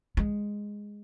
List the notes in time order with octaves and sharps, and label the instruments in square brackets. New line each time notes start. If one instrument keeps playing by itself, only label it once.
[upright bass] G#3